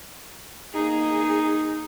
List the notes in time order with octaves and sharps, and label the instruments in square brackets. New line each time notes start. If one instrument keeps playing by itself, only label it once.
[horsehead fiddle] A#3 G#4 [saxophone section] D#4